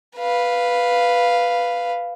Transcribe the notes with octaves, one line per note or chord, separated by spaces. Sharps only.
B4 F5